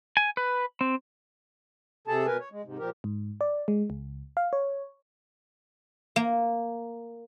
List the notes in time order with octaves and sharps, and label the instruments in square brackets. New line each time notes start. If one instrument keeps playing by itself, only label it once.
[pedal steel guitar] G#5
B4
C4
[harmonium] C3 G#4 A4 A5
B2 A#4 B4 G#5
C#5
G#3
G#2 C3
A#2 F3 G4 A#4
[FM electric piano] G#2
D5
G#3
C#2
F5
C#5
[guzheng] A#3